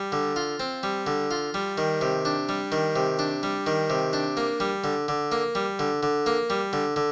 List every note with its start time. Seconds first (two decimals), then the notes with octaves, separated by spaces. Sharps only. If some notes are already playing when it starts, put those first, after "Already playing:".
Already playing: G3
0.12 D3
0.36 F4
0.60 C4
0.83 G3
1.07 D3
1.31 F4
1.54 G3
1.78 D#3
2.01 C3
2.25 D4
2.49 G3
2.72 D#3
2.96 C3
3.19 D4
3.43 G3
3.66 D#3
3.90 C3
4.13 D4
4.37 A#3
4.60 G3
4.84 D3
5.08 D3
5.32 A#3
5.55 G3
5.79 D3
6.03 D3
6.26 A#3
6.50 G3
6.73 D3
6.96 D3